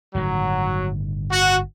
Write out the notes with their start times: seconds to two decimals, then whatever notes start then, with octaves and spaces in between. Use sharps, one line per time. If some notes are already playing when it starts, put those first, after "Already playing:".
0.15 G1 A2 D#3 F#3
1.30 F#4